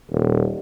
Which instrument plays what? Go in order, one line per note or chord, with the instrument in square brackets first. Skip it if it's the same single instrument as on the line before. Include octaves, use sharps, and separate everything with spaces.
[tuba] D#1